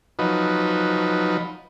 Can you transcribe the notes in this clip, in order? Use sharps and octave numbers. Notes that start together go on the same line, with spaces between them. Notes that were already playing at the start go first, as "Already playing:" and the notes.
F3 F#3 D#4 B4